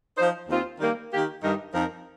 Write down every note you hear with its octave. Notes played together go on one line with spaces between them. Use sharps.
F3 D#4 C5
D#2 D#3 C4 F4 C5
D#3 G3 A#3
D#3 A#3 G4
G2 D#3 G3 D#4 A#4
F2 F3 D#4 A#4